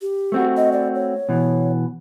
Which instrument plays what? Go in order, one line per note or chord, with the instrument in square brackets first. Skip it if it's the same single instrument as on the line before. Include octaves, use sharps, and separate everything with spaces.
[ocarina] G4
[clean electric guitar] A3 C4 F#4
[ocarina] D#5
D5
C#5
[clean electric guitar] B2 E3